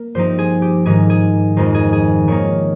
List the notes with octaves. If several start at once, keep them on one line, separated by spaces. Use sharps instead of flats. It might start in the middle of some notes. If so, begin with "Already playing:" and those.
Already playing: A#3
G2 F3 C4 D#4 C5
G#4
G4
G#2 D#3 G#3 D#4 G#4
G#4
F2 D#3 G#3 D#4 C5
G#4
G#4
D#3 A#3 D#4 C#5